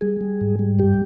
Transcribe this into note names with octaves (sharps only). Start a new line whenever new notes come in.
G3 G#4
G3
G#2
G3
G2 G4